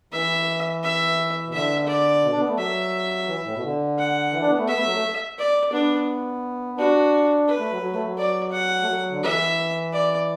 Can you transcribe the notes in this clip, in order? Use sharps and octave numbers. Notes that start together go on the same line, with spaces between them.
E3 E5
E5
B2
D3 E5
D5
B2
D4
B3
A3
F#3 E5
E3
A2
B2
D3
F#5
E3
D4
B3
A3
B3 E5
A3
F#3
A3
D5
B3 D4
D4 F#4
B4
A3
F#3
F#3
A3
F#3
D5
F#5
A3
F#3
D3
E3 E5
D5